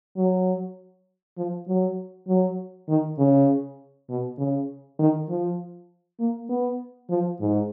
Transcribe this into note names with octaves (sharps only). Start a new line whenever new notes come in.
F#3
F3
F#3
F#3
D#3
C#3
B2
C#3
D#3
F3
A#3
B3
F3
G#2